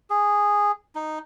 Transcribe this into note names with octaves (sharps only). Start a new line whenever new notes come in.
G#4
D#4